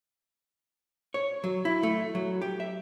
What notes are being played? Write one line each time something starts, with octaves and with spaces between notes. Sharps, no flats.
C#5
F#3
E4
A3
F#3
G4
E5